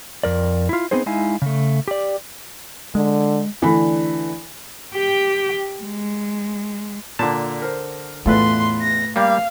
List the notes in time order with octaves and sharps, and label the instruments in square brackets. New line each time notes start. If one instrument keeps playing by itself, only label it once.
[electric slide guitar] F2 A#4 D5
E4 F4
B3 C4 D#4 G#4 C5
G#3 D#4 E4 F5 G#5
C#3 A3
G4 D5
[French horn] D3 [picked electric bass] G#3
[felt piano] D3 E3 A3 D4 B5
[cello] G4 G5
G#3
[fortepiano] A#2 [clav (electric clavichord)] D3 A5
[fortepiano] A#4 C5
[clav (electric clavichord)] E2 [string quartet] A2 C6 [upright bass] A3 [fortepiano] F4 A4 B4
[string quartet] A#6
[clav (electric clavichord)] G3 A#3 [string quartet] F5